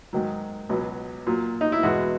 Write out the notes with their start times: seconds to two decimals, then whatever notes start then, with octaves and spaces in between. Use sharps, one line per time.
0.13 G#2 D#3 F#3
0.69 C#2 B2 F#3
1.27 A#2 F#3
1.61 D#4
1.72 E4
1.83 E2 B2 G#3 F#4